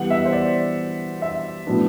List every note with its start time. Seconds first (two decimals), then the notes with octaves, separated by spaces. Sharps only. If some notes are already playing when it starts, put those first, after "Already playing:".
Already playing: E3 G3 B3 F#5
0.10 E5
0.25 C5
0.33 D5
1.22 E5
1.66 A2 F#3 B3 D4